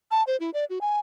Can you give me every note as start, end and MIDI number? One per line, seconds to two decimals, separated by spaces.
0.11 0.23 81
0.27 0.37 72
0.40 0.50 64
0.54 0.65 74
0.70 0.79 66
0.81 0.99 80